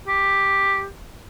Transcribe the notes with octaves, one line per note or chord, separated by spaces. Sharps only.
G4